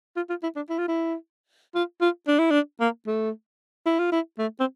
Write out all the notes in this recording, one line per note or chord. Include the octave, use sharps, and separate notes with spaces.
F4
F4
E4
D4
E4
F4
E4
F4
F4
D4
E4
D4
A#3
A3
E4
F4
E4
A3
C4